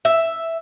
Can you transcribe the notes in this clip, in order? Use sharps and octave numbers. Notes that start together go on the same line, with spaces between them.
E5